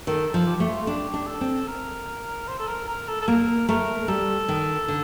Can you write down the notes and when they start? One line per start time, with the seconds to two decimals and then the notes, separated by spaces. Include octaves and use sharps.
0.07 D#3 A4
0.27 A4
0.34 F3
0.48 G4
0.60 A3
0.68 F4
0.87 D4 G4
1.14 D4
1.27 A4
1.41 C4
1.68 A#4
2.48 C5
2.59 A4
2.68 A#4
2.88 A#4
3.08 A4
3.21 A4
3.27 A#3 A#4
3.69 A3 A#4
4.08 G3 A4
4.48 D#3
4.88 D3